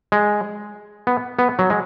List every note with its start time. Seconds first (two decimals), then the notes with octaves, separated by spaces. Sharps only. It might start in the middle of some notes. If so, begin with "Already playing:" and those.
0.12 G#3
1.07 B3
1.39 B3
1.59 F#3
1.70 G#3